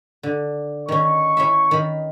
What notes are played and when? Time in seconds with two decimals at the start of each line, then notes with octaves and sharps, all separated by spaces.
0.23 D3
0.88 D#3 C#4 C#6
1.37 C#4 E4 E5
1.71 D#3 B5